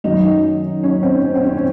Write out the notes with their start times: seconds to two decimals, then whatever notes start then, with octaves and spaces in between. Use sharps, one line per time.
0.04 F#2 D#3 F#3 D#4
0.83 C#4
1.03 C4
1.35 C4
1.43 C#4
1.57 C#4